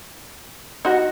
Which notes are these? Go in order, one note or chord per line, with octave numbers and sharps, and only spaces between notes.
D#4 F#4